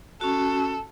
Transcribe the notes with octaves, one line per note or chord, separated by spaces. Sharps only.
C#4 F#4 A4